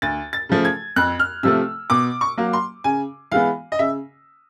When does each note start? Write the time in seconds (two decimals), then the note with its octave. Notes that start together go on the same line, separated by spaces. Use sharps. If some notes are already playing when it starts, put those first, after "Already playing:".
0.02 D2 A6
0.33 A6
0.49 C#3 F3 A3
0.65 G#6
0.96 F2 F#6
1.19 F6
1.43 C3 F3 A3 E6
1.90 B2 D6
2.21 C#6
2.37 F#3 A#3
2.53 C6
2.84 C#3 G#5
3.32 E3 G#3 B3 F5
3.72 D#5
3.79 C#3 E5